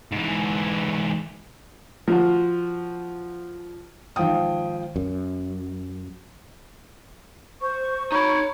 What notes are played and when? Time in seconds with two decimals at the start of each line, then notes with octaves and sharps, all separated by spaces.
0.12 G#2 E3
2.08 F3 F4 F#4
4.16 G#1 F3 F5 G5 D#6
4.96 F#2
7.62 C5 C#6
8.12 D#4 C#5 B5